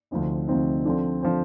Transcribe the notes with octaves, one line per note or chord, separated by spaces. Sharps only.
D2 C3 F3 C4 D#4
D2 C3 F3 C4 D#4
D3 F3 C4
D3 F3 C4